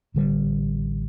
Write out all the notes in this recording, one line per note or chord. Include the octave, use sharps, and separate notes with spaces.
A1 D3 G3